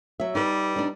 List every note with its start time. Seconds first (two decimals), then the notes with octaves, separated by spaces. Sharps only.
0.20 F#3 E5
0.35 G3 D#4 B4
0.76 D4 D#4